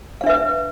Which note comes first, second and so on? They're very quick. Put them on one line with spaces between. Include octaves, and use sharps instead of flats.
F5 D4 E5 B4